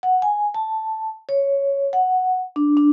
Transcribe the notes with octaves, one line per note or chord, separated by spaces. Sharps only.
F#5
G#5
A5
C#5
F#5
D4
D4